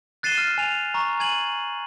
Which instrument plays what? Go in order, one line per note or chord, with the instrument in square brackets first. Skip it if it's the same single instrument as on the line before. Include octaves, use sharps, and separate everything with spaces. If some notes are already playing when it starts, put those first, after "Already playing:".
[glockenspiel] F#6 A6 C7 D#7 E7 G7
F6
G#5 F7
A#5 C#6
G#5 G#6 D#7 F#7